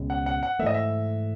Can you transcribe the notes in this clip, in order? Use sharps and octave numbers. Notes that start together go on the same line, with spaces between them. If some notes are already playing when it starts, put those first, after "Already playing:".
Already playing: C#2 B2 G#3 C#4
F#5
F#5
F#5
G#2 E3 A3 D#5 E5
E5